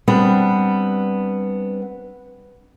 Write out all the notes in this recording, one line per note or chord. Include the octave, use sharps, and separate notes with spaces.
G3 B3 C4 D4